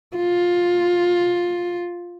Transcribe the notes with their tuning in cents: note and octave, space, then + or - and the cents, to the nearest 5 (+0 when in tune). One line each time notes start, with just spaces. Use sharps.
F4 +10